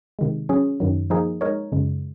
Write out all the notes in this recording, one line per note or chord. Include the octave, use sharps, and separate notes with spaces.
C3 D#3 G#3
F#3 C#4 G#4
F#2 D#3 F#3
F3 A#3 D#4 G#4
G#3 D#4 A#4 C#5
F#2 C#3 G#3